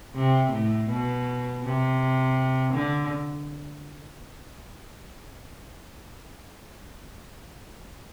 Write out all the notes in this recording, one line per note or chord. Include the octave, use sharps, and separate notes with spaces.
C3
A2
B2
C3
D3